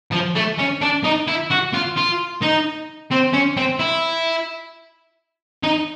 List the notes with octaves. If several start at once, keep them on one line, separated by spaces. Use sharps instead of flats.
F3
A3
C#4
D4
D#4
E4
F#4
F4
F4
D#4
C4
C#4
C4
E4
D#4